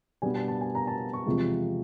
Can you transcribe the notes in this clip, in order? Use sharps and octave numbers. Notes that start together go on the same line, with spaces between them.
B2 G3 B3 D4 G#5
A5
A5
G#5
A#5
A5
C#6
E2 C3 F3 G#3